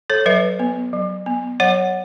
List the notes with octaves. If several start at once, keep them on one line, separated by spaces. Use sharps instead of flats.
A4 C#5
F#3 B4 E5
B3
F#3
B3
F#3 C#5 F#5